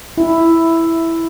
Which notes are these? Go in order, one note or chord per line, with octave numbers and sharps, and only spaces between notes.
E4